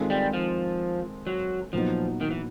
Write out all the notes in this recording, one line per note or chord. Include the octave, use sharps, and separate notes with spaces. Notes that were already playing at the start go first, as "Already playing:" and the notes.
Already playing: D#3 G#3 C4 F4 A4
G3
F3
F#3
A#2 F3 F#3 B3 D#4
D#3
E3